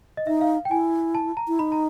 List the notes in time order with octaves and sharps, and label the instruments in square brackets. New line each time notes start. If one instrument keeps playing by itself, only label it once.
[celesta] D#5
[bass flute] D#4 [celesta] E5
[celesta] F5
G5
[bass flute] E4 [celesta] G#5
[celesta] A5
A#5
[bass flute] E4
[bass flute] D#4 [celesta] B5
[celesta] A#5